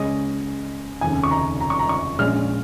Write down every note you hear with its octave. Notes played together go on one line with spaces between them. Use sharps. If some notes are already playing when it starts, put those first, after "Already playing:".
Already playing: C#2 C#3 G#3 C#4 D#5
F1 D#2 C#3 G#5
C#6
A#5
A#5
C#6
A#5
C#6
A#1 A#2 G#3 C#4 F6